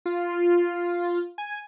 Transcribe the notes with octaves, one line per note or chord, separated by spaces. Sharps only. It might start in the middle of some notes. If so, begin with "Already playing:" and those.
F4
G#5